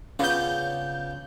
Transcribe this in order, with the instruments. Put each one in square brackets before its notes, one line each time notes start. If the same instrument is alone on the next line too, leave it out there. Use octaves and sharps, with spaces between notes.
[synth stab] C#3 G6 [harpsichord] B3 D4 F4